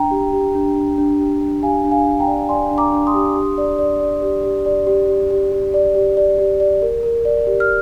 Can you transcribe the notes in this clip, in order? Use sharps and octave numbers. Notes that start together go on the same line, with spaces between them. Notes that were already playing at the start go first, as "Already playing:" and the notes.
Already playing: D4 G5 A#5
G4
G4
D4
D4
D4
G4
D4
G4 F5 G#5
D4
F5 G#5
D4
G5 A#5
D5
D5 G#5 C6
D4
A#5 D6
D4
C6 D#6
G4
G4
D5
D5
D5
G4
G4
D5
G4
G4
G4
G4
D5
G4
D5
G4
D5
A#4
A#4
D5
G4
F6